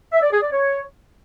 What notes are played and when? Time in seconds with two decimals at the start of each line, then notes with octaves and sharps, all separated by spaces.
0.13 E5
0.22 D5
0.32 G#4
0.42 D5
0.52 C#5